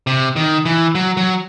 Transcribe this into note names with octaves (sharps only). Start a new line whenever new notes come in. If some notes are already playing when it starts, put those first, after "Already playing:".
C3
D#3
E3
F#3
F#3